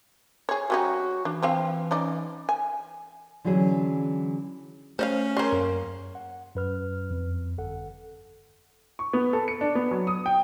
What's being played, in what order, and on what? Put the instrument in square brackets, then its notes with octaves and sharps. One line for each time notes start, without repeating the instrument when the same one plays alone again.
[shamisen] G#4 C#5
[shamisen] G3 C#4 D#4 [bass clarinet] F#4
[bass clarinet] E3 [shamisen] D4
[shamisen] F3 C4 F5
C#4 D#4 D5
G#5
[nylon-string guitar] D3 E3 F#3 C#4 G#4
[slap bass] A3 [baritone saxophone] C#4 [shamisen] C5 D#5 F5
[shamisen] C#3 C5 [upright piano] A#4 C#5 C6
[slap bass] F#2 [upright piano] A#3
[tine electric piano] F#5
F#2 B4 F6
F2
G1 A4 F#5
[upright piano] C#6
B3
A4
C#7
D4
B3
F#3
D#6
G5